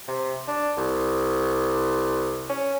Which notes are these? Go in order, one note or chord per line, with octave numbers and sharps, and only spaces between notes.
C3
D4
C2
C#4